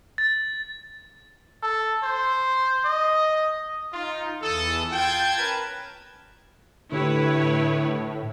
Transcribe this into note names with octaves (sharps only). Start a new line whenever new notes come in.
A6
A4
C5
D#5
D#4 F4
E2 E3 A4 D#6
F4 G5 A5 G#6
C#4 A#4 B4
A2 D3 E4 G4 B4 C#5